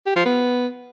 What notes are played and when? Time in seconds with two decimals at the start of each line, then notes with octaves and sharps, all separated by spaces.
0.06 G4
0.16 F3
0.25 B3